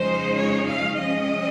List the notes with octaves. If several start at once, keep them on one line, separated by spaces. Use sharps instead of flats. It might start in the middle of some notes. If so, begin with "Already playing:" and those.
Already playing: F2 C#3 F3 G#3 D#4 C5
C#5
F5
C3 F3 G#3 C#4 D#5